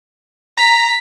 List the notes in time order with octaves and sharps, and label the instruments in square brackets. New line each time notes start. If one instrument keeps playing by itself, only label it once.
[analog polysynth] A#5 [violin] B6